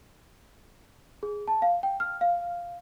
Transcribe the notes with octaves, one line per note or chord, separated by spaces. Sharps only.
G#4
A5
F5
G5
F6
F5